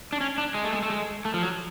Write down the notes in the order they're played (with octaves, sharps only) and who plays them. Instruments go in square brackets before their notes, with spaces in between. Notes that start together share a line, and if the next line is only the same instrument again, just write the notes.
[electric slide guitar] D4
C#4
D4
G#3
A3
G#3
A3
G#3
A3
F3
F#3